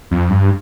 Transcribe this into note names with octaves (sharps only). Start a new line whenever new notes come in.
F2
G2